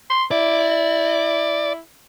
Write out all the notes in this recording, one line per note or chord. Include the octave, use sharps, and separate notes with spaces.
C6
E4 D5